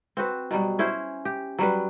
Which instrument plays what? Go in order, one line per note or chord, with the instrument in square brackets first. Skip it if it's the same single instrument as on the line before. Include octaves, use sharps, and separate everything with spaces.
[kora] C4 F#4 B4
B2 F#3 G3
C#4 E4 C5
G4
F#3 G3 B4